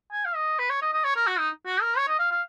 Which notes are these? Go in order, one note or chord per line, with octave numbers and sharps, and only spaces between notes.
G#5
F5
D#5
B4
C#5
D#5
D#5
C#5
A#4
F#4
D#4
F#4
A#4
C#5
D#5
F5
F5